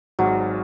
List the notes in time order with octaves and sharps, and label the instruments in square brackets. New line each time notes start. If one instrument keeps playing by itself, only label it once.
[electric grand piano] G#1 G#2 [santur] F#3